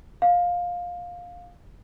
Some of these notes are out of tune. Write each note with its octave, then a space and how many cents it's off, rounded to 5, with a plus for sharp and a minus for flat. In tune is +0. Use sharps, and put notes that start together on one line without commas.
F5 +15